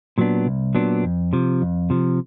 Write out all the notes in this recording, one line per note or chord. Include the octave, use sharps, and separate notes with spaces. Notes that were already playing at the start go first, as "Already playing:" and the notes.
A#2 F#3 B3 D4
C2
A#2 F#3 B3 D4
F2
C3 F3
F2
C3 F3